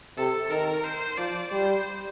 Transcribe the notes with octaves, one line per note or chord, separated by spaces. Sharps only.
C3 A4
D#3 A#4
C5
F3 D5
G3 C5